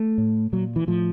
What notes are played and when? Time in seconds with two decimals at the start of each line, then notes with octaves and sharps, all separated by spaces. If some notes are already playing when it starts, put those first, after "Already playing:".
Already playing: A3
0.18 A2
0.53 A#2 F#3
0.76 E3
0.87 A2 F3